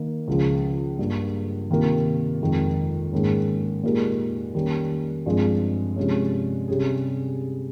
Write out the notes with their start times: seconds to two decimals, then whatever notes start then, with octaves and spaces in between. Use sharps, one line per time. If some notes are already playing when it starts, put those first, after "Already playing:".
Already playing: D#3 A#3 D#4
0.28 C#2 C#3 F3
0.99 G2 G3 A#3
1.70 C3 D#3 A#3 F4 A#4
2.41 F2 D#3 G#3
3.12 G#2 D#3 A#3 C#4
3.83 A#2 G#3 D#4 G4 A#4
4.55 D#3 G3 A#3 C#4
5.26 G2 F3 G#3 C4
5.96 C3 F3 G#3 C#4
6.68 C3 G3 C#4 G#4